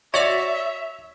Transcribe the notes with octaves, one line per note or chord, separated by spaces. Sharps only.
F#4 C#5 D5 E5